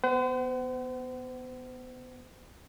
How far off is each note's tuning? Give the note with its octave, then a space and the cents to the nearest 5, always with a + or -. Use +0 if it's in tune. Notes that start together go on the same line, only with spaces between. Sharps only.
B3 +0 C5 -40 F#5 +35